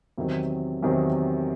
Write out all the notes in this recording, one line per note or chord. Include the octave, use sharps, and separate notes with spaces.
E2 C3 D#3 F#3
E2 C3 D#3 F#3